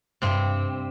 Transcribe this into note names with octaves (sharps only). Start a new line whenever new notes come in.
G2 C3 C4